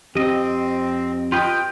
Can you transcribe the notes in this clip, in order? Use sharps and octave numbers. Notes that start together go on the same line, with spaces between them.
F2 C4 G4 D#5
F4 B4 D#5 G5